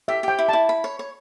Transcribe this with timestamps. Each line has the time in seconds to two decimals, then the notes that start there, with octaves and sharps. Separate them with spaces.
0.08 G4 E5
0.23 G4 G5
0.38 E4
0.49 E4 A5
0.69 B5
0.84 C#5
0.99 C#5